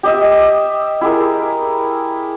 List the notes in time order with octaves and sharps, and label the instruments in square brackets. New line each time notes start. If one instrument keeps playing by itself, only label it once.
[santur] G4 D#5 E5
E4 G4 G#4 A#4